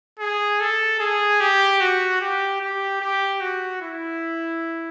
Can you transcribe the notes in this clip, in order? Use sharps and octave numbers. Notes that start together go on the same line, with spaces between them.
G#4
A4
G#4
G4
F#4
G4
G4
G4
F#4
E4